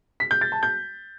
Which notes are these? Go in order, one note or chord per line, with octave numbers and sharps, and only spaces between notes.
B6
G6
A6
A5
G6